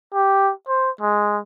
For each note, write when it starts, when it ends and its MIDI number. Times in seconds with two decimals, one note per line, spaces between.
0.14 0.52 67
0.68 0.90 72
1.01 1.39 56